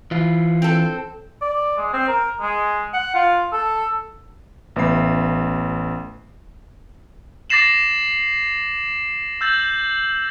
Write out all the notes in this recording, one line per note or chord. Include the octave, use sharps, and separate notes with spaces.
E3 F4
C4 A4
D5
G#3
C4
A#4
G#3
F#5
F4
A4
A1 B3 E5 B5 C7
D6 A6 A#6 C7 E7 F#7
E6 G6 A6 F#7